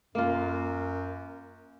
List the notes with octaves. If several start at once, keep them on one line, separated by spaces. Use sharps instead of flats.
F#2 A#3 F4